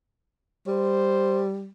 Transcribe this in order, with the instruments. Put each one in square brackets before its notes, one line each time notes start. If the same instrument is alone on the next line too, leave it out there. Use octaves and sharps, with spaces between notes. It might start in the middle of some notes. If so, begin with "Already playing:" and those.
[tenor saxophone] G3 [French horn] C5